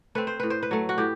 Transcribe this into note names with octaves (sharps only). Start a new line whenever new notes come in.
A3 C4 B4
C5
A2 B4
C5
B4
F#3 A3
F#4
A2 G4